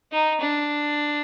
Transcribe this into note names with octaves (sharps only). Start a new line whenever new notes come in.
D#4
D4